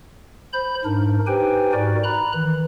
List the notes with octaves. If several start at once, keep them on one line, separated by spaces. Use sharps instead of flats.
C5 B5 G6
G#2 D4 D#4 A#4
D#4 G4 B4 C5 G5 G#5
G#2 D#4 F#4 A#4 D5
A#5 B5 F#6
D#3 E3